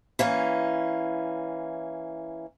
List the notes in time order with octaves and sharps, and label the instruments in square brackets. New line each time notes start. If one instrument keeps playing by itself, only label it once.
[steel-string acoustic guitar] E3 A#3 C#4